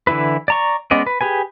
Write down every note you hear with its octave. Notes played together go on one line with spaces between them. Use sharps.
D3 E3 E4 B4
D5 A#5 C#6
G#3 B3 C#4 D5 D#5
B4
G4 G#4 B4 G#5